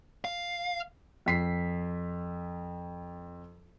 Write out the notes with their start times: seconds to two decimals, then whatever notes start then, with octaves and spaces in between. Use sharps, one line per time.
0.25 F5
1.26 F2 B6 C7